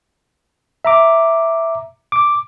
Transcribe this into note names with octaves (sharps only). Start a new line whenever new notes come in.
E5 A#5 D6
D6